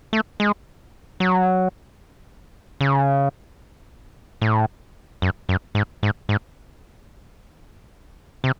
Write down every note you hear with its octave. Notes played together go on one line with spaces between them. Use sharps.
A3
G#3
F#3
C#3
A2
F#2
F#2
G#2
G#2
G#2
C3